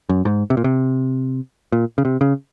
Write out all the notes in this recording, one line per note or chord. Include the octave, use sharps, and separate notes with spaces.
F#2
G#2
C3
A#2
C3
A#2
C#3
C3
C#3